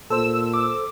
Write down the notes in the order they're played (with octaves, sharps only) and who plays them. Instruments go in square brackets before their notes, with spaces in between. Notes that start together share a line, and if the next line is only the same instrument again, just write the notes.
[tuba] A#2 [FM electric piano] A4 C5 [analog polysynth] E6
[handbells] D6